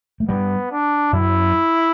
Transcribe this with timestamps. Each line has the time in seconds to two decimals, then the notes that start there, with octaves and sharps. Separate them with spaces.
0.20 A3
0.29 G2 G3 B3
0.72 D4
1.13 F#2 F#3 E4